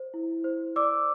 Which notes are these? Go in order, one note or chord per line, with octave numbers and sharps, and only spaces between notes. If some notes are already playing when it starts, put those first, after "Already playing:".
Already playing: C5
E4
C5
D5 D6 E6